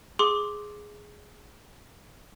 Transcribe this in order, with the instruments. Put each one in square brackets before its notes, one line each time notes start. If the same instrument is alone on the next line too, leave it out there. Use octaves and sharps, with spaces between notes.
[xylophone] G#4 C6 D6